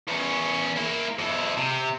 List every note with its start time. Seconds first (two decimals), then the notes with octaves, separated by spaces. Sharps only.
0.08 E2 C#4
0.77 A#3 E4
1.19 F2 E4
1.57 C3